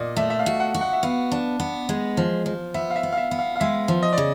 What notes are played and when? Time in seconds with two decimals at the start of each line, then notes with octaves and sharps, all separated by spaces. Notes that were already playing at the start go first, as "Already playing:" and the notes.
Already playing: A#2 D5 D#5
0.16 A3 E5
0.30 E5
0.39 F5
0.46 F#4
0.60 F#5
0.74 F#4
0.81 F#5
0.93 E5
1.03 B3 F5
1.32 D4
1.60 B3
1.89 G#3
2.17 F3
2.46 F3
2.74 B3 E5
2.90 F5
2.96 E5
3.03 B3
3.13 F5
3.17 E5
3.31 B3
3.39 F5
3.56 F5
3.60 G#3 E5
3.88 F3
4.03 D#5
4.13 D5
4.18 C#3